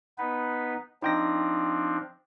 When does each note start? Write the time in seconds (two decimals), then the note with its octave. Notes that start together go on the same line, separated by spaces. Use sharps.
0.18 B3 D#4 B4
1.02 F3 C4 D4 D#4 G5 A#6